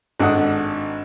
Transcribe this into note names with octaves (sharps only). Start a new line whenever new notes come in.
G#1 D4 A4 F#5 D#6 F#6